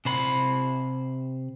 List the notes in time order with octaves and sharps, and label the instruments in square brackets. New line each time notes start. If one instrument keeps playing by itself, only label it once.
[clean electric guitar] C3 C5 B5